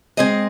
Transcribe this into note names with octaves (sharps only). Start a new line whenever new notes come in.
G#3 C4 G#4 D#5